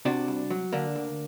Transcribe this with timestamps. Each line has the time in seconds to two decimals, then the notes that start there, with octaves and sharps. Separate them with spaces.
0.05 C3 D4 F#4
0.28 C2
0.50 F#3
0.73 D3 A#3 D4
0.96 D2